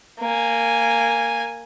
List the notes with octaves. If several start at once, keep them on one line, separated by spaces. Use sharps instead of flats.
A#3 G#5